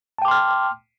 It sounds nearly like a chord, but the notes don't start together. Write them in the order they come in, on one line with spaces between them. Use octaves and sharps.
A5 G5 D6 C6 F6